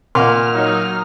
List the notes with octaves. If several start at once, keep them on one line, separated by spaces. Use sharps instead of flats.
A#2 D#5 F#5 C6 F6
F#3 D#4